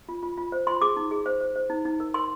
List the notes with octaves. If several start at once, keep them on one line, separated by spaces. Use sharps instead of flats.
F4
F4
F4
C5
F4 C6
G#4 D6
D#4
G#4
C5
C5
C5
D#4
D#4
A#4
A#4 C6